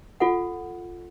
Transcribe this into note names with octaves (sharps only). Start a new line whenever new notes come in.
F4 A4 F#5